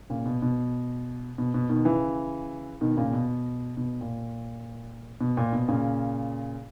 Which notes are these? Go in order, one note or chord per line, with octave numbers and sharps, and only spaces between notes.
A#2 C#3
B2
B2
B2
B2
B2 D#3
C#3 E3
B2 D#3
A#2 C#3
B2
B2
A#2
B2
A#2
B2
A#2 C#3